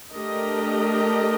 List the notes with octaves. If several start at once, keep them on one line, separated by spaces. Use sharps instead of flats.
A3 D4 G4 A#4 D#5